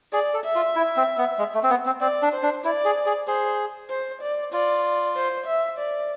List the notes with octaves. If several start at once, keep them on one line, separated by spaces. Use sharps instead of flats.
G#4 D5
A4
E5
F4
E4
C4
B3
G#3
A3
C4
B3
C4
C4 D5
D4
C5
D4
E4 D5
G#4
G#4
G#4 C5
C5
D5
F4 D5
C5
E5
D5